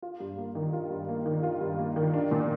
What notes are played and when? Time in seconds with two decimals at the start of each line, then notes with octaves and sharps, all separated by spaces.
0.02 F4
0.20 G2
0.38 A#3
0.55 D#3
0.73 F4
0.90 G2
1.09 A#3
1.26 D#3
1.43 F4
1.61 G2
1.79 A#3
1.96 D#3
2.14 D4
2.31 A#2